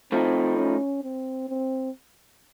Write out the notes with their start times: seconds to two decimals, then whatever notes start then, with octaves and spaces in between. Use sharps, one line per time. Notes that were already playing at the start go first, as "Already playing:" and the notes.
0.12 A2 F3 A3 C4 D#4
0.58 C#4
1.03 C4
1.49 C4